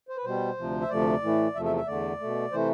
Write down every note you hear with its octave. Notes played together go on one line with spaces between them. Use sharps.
C5
B4
B2 G3 C5
D2 C3 F3
E5
D2 C3 F3 A3 D5
A2 E3 A3
E2 C3 F3 A3 E5
E5
E5
E2 D3 A3 D5
B2 A3
C3 E3 A3 C5